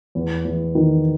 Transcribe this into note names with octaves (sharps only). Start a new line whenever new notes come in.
E2
E2
D#3